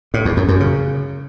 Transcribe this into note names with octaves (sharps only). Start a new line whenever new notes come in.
A2
E2
F#2
F#2
C#3